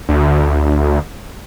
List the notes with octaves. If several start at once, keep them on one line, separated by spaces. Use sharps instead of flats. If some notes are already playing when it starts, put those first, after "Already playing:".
D2